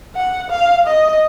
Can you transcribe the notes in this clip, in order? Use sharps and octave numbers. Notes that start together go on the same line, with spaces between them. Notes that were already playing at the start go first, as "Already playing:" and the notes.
F#5
F5
D#5